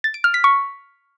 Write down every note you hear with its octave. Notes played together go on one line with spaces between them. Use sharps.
A6
D7
F6
B6
C#6